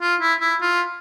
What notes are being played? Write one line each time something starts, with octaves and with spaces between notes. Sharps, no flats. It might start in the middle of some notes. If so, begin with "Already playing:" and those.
F4
E4
E4
F4